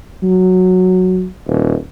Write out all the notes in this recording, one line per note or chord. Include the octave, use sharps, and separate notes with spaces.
F#3
D#1